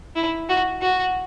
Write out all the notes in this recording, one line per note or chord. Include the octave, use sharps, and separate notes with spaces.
E4
F#4
F#4